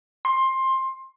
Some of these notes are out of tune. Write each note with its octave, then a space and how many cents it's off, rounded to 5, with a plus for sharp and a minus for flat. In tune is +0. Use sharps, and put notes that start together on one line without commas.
C6 +20